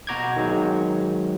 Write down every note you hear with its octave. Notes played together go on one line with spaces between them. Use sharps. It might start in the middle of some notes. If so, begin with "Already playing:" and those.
B2 F#4 A#5 D6 G6 G#6
D#3 F#3 G#3